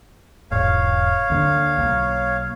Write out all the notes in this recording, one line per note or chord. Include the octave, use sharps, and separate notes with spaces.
E1 G#2 C#5 F5
D2 D3 A#3
B1 A#3